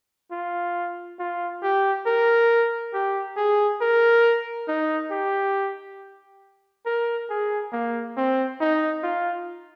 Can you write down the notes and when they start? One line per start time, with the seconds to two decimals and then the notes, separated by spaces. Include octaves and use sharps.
0.31 F4
1.19 F4
1.63 G4
2.06 A#4
2.94 G4
3.37 G#4
3.81 A#4
4.68 D#4
5.11 G4
6.86 A#4
7.30 G#4
7.72 A#3
8.17 C4
8.61 D#4
9.03 F4